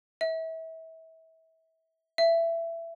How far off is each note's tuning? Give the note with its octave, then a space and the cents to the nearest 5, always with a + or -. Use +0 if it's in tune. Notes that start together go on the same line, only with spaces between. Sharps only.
E5 -30
E5 +20